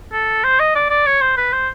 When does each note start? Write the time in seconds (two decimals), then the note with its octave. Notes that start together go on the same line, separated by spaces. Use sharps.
0.13 A4
0.44 C5
0.60 D#5
0.75 D5
0.90 D5
1.06 C#5
1.21 C5
1.37 B4
1.53 C5